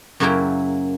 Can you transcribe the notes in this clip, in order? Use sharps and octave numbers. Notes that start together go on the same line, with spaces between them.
F#2 C#3 F#3 A#3 E4 G5